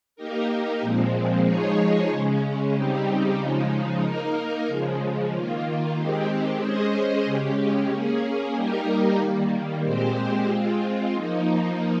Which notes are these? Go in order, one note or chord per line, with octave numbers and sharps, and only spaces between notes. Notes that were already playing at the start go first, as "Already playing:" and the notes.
A#3 D#4 G4 A#4
A#2 F3 G#3 C4
F3 G#3 D#4 G#4 C#5
C#3 G#3 C#4
C#3 G3 C4 D#4 G4
C#3 F3 G#3 D#4
A#3 D#4 A#4
C#3 F3 G#3
D#3 A#3 F4
D#3 G#3 C4 G4
G#3 C#4 G#4 C5 D#5
C#3 G#3 C#4 G4
A#3 C#4 G#4
G3 A#3 D#4 G4 A#4
D#3 G3 A#3
A#2 G#3 C4 G4 C5
G#3 C4 F4
F3 A#3 D#4